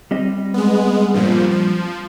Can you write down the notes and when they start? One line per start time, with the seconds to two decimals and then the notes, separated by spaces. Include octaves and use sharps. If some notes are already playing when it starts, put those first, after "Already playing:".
0.11 G3 C4 D#5
0.54 G#3 B3
1.14 G2 A#2 F3
1.51 F3